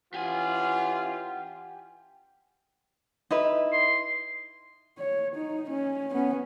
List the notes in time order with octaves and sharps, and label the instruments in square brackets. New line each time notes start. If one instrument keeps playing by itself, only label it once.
[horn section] E3 C#4 F4 [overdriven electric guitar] G4 G#5 [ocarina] F#5
[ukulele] D#4 E4 B4
[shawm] C6
[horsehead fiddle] C#5
D#4
C#4
B3 C#4